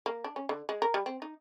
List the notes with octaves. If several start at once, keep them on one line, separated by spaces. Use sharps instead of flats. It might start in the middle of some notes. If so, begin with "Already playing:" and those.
A#3
D4
C#4
D3
G#3
A#4
G3
C4
D#4